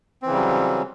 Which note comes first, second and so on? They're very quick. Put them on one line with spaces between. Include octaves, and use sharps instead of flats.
C4 E3 C#3 G3 F#3